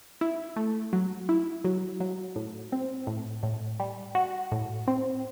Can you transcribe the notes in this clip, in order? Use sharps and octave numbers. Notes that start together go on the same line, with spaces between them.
E4
A3
F#3
E4
F#3
F#3
A2
C4
A2
A2
G3
F#4
A2
C4